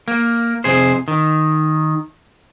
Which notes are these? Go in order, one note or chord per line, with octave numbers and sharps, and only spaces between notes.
A#3
F2 C3 G#4 C5
D#3